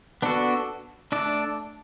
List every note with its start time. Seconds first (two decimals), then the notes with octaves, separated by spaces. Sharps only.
0.22 B3 D4 F#4 A4
1.12 A3 D4 A4 D5